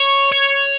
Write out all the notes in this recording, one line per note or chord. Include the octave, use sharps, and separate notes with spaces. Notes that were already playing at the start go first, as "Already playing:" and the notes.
Already playing: C#5
C#5